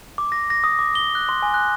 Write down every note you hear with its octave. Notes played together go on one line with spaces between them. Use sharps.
D6
A#6
A#6
D#6
D6
G7
F#6
C6
G#5
F#6